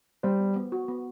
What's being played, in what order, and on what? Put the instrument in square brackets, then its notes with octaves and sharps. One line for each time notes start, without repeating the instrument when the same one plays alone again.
[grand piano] G3 [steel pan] C5
[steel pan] B3
B3
F#4
B3